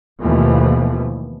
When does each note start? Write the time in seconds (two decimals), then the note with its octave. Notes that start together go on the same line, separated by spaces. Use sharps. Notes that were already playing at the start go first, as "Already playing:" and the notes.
0.21 D#2 B2 E3 F3 A3 B3